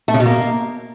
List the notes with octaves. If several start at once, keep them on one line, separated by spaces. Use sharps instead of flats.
A3
C#3
B2
A#3